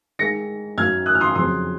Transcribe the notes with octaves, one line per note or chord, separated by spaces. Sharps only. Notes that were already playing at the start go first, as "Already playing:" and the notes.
D#3 G#3 D#4 A#6 C#7
F#2 D#3 F#3 F6 G#6
D#6 F#6
F6
C6 D#6
F2 C#3 F#3 C4 C6 D#6